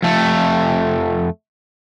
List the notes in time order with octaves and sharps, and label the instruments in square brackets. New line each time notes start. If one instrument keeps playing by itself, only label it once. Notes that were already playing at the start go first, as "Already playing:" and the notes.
[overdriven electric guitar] F2 A3